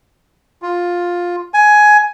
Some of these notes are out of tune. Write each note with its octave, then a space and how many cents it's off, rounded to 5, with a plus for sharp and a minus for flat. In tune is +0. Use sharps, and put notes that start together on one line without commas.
F4 +10
G#5 +15